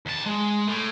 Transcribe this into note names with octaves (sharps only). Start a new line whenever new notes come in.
D#2 A5
G#3
A2